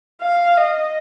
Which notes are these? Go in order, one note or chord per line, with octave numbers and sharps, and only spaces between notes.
F5
D#5